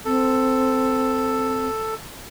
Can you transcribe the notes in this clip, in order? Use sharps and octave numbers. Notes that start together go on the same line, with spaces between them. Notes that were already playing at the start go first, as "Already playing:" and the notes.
C4 A4